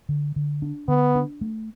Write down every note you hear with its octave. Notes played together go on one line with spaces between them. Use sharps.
D3
D3
D4
D3 B3
D4
A3